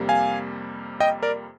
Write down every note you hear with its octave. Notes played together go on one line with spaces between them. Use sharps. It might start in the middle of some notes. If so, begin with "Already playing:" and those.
Already playing: F2 C3 G3 A#3
F5 G#5
D#5 G5
A#4 D5